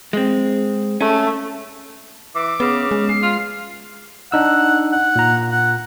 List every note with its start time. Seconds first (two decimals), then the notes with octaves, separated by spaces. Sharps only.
0.13 G#3 C4
1.01 A3 C#4
2.35 E3 D6
2.60 C#3 B3
2.91 G#3
3.09 G#3 C7
3.22 F4
4.32 D4 D#4 F#5 E6
4.93 F#5
5.16 A#2 A#5
5.52 F#5